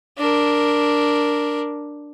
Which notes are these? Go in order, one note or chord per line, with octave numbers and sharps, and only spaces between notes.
D4 A#4